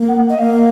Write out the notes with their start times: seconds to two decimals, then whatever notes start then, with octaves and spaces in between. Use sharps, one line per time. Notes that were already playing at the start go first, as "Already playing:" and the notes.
Already playing: A#3
0.08 F#5
0.29 D#5
0.38 A#3 F5